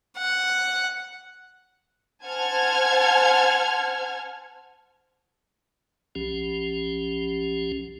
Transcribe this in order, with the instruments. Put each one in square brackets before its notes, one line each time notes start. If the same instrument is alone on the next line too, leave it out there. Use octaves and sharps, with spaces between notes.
[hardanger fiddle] F#5
[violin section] C5 F#5 G#5 A5 F6 G#6
[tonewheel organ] B1 F3 C#4 G4